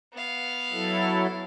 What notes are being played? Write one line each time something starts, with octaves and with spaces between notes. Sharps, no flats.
B3 F5
F#3 E4 A4